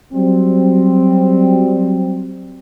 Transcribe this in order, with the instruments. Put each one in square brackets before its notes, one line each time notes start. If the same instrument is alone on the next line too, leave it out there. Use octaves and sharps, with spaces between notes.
[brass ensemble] F#3 G3 C4